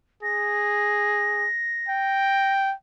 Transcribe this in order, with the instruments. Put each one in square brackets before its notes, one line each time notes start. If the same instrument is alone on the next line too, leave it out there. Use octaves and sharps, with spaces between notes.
[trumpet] G#4 [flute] A#6
[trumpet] G5